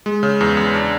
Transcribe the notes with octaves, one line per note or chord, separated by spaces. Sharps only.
G#3
C#3
E2
E2
D4